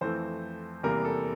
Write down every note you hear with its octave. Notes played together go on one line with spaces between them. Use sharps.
F2 E3 A3 C4 C5
E2 C3 G3 A#3 A#4
A4